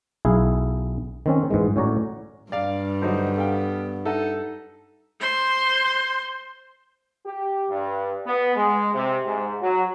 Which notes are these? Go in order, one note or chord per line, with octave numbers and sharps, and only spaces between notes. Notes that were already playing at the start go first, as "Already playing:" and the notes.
B1 E4 G#4 F5
D#3 C4 C#4
G#2 E3 G#3
A2 C#4 F#4 C#5 D5 A#5
G2 D5 F5
D3 F#3 D#4 C5
B3 A4 F5 G5
D#4 A4 E5 F#5
C5 C6
G4
G2
B3
G#3
C3
G#2
F#3